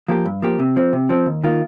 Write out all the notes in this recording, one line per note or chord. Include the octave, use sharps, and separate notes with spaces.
F3 A#3 G4
G2
F3 A#3 G4
C3
F3 C4
C3
F3 C4
D#2
D#3 A#3 F4